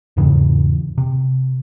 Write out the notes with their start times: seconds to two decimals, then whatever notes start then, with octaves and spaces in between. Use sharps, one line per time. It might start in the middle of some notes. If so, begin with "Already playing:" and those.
0.17 E2 G#2 C#3 E3
0.98 C3